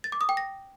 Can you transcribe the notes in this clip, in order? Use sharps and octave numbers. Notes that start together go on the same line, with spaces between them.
A6
D6
D#6
G5
A#6